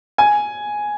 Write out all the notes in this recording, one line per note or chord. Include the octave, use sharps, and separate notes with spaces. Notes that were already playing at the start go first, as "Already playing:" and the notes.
G#5